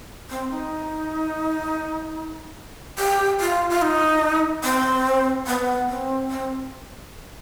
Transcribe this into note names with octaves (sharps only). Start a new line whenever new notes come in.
C4
D#4
G4
F4
F4
D#4
C4
B3
C4
C4